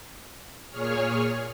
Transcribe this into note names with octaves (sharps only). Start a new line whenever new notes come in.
A#2 G#4 C#5 F6